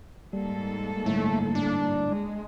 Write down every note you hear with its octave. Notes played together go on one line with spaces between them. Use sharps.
G#2 G3 A#3 A4
G1 A2 A3
D4
G#3